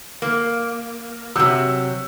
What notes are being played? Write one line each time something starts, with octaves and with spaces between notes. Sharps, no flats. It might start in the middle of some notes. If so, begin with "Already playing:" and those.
A#3
C3 F#3 E6 G6